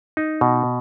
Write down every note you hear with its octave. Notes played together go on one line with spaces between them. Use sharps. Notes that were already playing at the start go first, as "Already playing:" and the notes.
D#4
B2